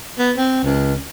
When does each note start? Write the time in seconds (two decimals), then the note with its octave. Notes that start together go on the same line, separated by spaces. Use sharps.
0.19 B3
0.37 C4
0.63 C#2